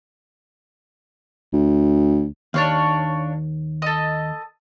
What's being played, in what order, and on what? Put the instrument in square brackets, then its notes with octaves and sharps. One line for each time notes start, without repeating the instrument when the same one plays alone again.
[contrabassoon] D2
[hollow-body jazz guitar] D#2 [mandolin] D4 C#5 F5
[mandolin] A4 D#5